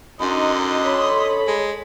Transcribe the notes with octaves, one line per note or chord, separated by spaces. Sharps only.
F#2 D3 D#4 D#5 C6
A4 C#5 B5
G#3